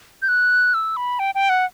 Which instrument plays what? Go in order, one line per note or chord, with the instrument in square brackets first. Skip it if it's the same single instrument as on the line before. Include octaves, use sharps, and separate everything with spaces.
[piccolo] G6
F#6
E6
B5
G5
G5
F#5